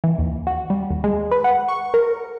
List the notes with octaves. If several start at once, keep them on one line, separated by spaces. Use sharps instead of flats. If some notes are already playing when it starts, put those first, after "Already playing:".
E3
D#2
F#4
G3
D#2
G#3
B4
F#5
C#6
A#4